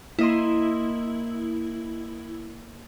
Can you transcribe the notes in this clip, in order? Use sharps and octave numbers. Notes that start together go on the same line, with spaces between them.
A#3 E4 D#5 C6